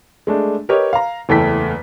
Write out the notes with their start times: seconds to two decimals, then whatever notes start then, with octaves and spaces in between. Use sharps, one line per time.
0.27 G#3 A3 D4
0.69 G4 A#4 B4 C#5 D#5
0.93 F5 A#5
1.29 F#1 E2 A3 A4 G5 B6